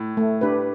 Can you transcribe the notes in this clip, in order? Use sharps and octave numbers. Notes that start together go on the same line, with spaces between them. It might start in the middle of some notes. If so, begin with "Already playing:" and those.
Already playing: A2
A3
D4 G4 B4